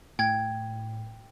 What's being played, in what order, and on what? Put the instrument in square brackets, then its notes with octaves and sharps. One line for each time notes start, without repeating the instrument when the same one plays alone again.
[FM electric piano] A2 [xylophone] G5 G#6